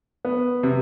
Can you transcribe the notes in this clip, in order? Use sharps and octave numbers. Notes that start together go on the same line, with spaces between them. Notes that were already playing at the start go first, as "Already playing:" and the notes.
B3
C3